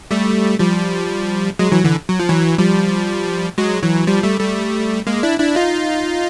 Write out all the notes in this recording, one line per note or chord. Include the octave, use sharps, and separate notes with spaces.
G3 A3
F3 G3
F#3 G#3
E3 F#3
D3 E3
F#3
F3
E3 F#3
F3 G3
F#3 G#3
E3 F#3
F3 G3
G3 A3
G3 A3
G#3 A#3
D4 E4
D4 E4
D#4 F4